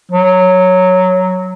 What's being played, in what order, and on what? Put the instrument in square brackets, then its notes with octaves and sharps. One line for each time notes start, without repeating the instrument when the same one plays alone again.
[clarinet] F#3